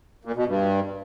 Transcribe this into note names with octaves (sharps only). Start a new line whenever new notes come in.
A#2
B2
G2